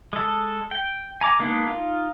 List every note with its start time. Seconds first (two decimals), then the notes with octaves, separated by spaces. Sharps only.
0.13 G#3 A4
0.71 G5
1.21 G#5 A#5 D6
1.39 G#3 A#3 B3 D4 D#4
1.67 D#4 F4